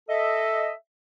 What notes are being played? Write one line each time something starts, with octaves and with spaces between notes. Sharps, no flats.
A4 D#5 E5